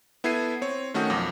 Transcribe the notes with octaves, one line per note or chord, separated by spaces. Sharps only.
B3 E4 A4 G#6 C7 D#7
C4 C#5
D#3 A3 C#4 F#4 D#6 G6
B1 F2 D6 A#6